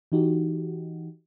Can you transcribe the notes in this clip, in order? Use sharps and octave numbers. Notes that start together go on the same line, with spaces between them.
E3 D#4 F#4 G4